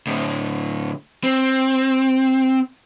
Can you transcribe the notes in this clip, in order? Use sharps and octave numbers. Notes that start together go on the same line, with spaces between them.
A2 D3
C4